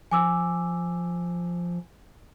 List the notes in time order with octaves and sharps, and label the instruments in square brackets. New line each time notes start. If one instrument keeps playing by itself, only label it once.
[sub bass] F3 [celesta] G#5 D6 E6